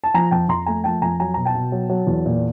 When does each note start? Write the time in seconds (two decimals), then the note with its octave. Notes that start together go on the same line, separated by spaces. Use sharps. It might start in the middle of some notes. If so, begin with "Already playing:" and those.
0.04 A5
0.14 F3 G#5 A#5
0.31 F2 G5 A5
0.49 F2 A#5 C6
0.66 A3 G#5 A#5
0.84 F3 G5 A5
1.02 F2 G#5 A#5
1.20 F#3 G#5 A#5
1.34 B2 A#5
1.45 G5 A5
1.55 B2
1.72 F#3
1.90 F#3
2.07 E2
2.26 A#2